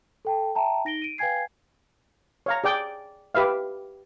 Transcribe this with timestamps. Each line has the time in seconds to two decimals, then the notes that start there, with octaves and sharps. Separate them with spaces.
0.25 A4 G5 A5
0.55 E5 G5 A5 A#5
0.85 D#4 A#6 D7 G7
1.02 D7 D#7
1.18 B4 F5 G5 G#5 G#6 C7
2.46 C#5 F5 A#5
2.64 G#4 D5 G5
3.35 G4 B4 E5 F5